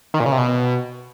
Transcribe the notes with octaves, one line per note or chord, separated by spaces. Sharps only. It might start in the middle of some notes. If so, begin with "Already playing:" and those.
D#3
A#2
C#3
C3
B2